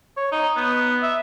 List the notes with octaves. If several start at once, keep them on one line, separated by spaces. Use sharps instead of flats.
C#5
D#4
B3
E5